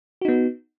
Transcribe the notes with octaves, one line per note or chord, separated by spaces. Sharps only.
B3 D#4 F#4